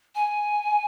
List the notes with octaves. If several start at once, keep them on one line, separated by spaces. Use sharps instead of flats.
G#5